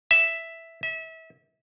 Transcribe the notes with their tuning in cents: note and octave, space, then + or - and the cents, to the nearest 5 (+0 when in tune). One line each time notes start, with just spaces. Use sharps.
E5 +0
E5 -30